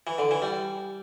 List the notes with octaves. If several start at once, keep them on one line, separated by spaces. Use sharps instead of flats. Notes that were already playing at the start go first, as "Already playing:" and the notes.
E3
D3
E3
G3